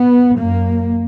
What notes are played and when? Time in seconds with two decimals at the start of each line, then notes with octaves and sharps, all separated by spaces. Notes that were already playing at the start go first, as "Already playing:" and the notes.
Already playing: B3
0.38 F#2 A#3